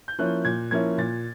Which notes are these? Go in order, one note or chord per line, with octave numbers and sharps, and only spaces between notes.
G6
F3 A#3 C#4 E4 F#6
A#2 G#6
F3 A#3 C#4 E4 G#6
A#2 A6